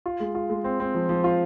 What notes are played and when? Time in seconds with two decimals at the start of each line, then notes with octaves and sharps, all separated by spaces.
0.06 F4
0.20 G#3
0.35 F4
0.50 G#3
0.64 C4
0.80 C4
0.95 F3
1.09 F3
1.24 F4